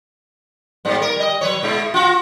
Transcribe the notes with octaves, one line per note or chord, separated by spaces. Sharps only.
G#2 G3 B3
A#4
G3 D#5
F#3 B4 C#5
B2 G#3 E4
F4 F#4